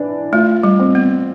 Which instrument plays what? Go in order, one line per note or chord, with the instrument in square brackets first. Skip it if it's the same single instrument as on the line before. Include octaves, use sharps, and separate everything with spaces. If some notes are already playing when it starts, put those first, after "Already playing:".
Already playing: [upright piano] E3 D4
[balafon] A3 [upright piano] F4
[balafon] G3
[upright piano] C4
[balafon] B3